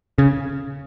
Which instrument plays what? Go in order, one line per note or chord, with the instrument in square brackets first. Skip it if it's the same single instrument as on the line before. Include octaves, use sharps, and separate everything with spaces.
[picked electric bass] C#3